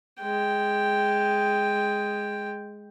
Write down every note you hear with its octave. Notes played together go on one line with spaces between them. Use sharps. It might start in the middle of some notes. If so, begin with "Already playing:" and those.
G#3 G5